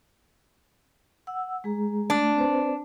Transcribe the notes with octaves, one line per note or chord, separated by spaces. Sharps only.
F#5 E6
G#3 G#4 A#5
A3 D4
C4 B4 C5